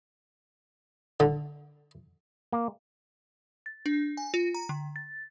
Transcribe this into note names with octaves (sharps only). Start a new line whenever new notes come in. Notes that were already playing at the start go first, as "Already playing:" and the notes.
D3
A#3
A6
D4
G#5
F4
A#5
D3
A6